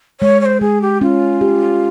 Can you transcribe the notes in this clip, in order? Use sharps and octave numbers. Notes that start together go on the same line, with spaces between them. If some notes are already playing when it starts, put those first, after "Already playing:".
G#3 C#5
C#5
C5
G#3 G#4
G4
C#4 F4
G4